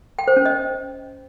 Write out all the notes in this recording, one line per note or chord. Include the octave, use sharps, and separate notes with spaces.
G5
C5
C#4
D#5